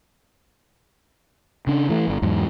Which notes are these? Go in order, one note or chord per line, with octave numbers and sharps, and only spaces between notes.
C#3 D4
E3 A3
G1 D3
E2 G#2 F#3